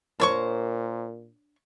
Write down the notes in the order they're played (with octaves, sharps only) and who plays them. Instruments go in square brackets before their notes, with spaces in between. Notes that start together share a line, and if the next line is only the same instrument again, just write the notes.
[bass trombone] A#2 [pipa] D4 C#5 C#6 [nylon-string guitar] A#4 C5